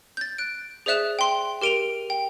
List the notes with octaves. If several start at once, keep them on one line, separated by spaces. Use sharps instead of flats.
G6 A6
F#6 D7
G#4 C5 D5 E5 F#6 E7
G5 C6
G4 A#4 D7 D#7 F7
G5